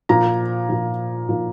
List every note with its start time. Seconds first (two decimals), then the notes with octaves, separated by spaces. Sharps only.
0.09 A#2 F3 A#5
0.69 A#2 F3
1.29 A#2 F3